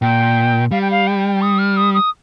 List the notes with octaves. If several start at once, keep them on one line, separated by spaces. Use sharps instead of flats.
A#2 G5
G3 F5
G5
F5
G5
D#6
F6
D#6
D#6